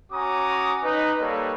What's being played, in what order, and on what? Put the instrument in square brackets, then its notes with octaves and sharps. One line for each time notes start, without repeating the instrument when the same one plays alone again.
[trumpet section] C#4 F#4 G#5 A#5 D6 D#6
D#4 B4
G3 A#3 A4 B4 C#5